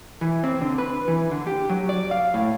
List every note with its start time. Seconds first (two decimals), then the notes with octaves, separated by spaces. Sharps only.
0.21 E3
0.44 C4
0.61 D3
0.78 B4
1.08 E3
1.31 D3
1.47 G4
1.69 F#3
1.89 D5
2.11 F5
2.34 A2